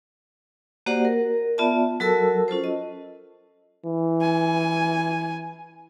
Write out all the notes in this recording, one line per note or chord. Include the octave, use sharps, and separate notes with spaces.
A#3 F#4 G4 C5 D5 F#5
A#4
B3 F4 D5 E5 A5
F#3 F#4 A4 A#4 A5 E6
C#4 F4 A4 C5
D#5
E3
G#5